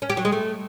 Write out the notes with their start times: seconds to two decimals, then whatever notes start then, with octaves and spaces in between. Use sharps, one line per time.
0.02 C#4
0.10 G4
0.17 F#3
0.25 G#3
0.32 A3